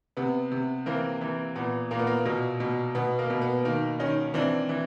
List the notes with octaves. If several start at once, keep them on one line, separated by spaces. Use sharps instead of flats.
C3 B3
C3
E3 A#3 C4
E3
A#2 B3
A#2 A#3
B3
A#3
B2 A#3
B2
B2 B3
A#3
B2
B3
D#3 A#3
D#3 C#4 D#4
E3 C4 D4
E3